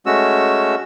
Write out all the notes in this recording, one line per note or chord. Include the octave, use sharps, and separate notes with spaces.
G#3 A3 C#4 F#4 E6